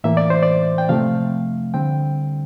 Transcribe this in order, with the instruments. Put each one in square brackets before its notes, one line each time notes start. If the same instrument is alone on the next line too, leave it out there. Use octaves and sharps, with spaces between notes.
[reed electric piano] A2 E3 A#3 E5
D5
C5
D5
G5
C3 F3 A3 C4 F5
D3 G3 C4 G5